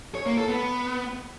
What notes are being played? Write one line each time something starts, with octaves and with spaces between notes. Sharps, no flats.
C#5
A#3
A4
B3